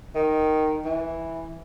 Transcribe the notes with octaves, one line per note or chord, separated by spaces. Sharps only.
D#3
E3